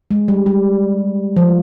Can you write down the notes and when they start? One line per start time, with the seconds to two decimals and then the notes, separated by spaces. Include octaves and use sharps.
0.11 G#3
0.28 G3
0.46 G3
1.36 F3